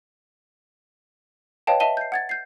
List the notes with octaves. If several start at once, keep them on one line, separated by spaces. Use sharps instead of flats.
B4 C#5 D#5 F5 G5 A5
D#5 E5 A5 D#7 G7
G6 C7
F#5 G#6 A6
G6 C7